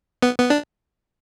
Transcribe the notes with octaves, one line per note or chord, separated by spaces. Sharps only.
B3
B3
D4